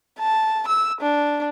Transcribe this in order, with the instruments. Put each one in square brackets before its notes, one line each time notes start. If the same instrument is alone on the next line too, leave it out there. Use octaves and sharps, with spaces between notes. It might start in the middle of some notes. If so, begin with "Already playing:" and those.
[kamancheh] A5
E6
D4